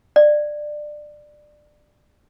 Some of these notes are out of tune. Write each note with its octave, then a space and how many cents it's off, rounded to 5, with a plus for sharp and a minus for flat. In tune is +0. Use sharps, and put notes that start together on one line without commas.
D5 +20